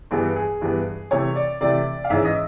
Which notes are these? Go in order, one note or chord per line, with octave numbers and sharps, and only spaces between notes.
G2 E3 G3 B3 G#4
G#4
G2 E3 G3 B3
C3 E3 A3 C#5
D5
C3 E3 A3 D5
F5
G#2 E3 G#3 C#4 E5
D#5